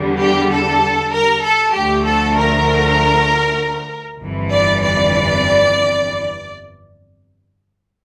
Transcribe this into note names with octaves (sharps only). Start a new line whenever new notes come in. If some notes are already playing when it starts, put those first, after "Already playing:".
Already playing: E2 D3 G3
G4
A4
A#4
A4
D2 D3 F3 A3 G4
A4
A#4
G1 F2 E3
D5
D5